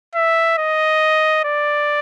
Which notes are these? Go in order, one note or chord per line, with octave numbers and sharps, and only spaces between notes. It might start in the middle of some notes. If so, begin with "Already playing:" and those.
E5
D#5
D5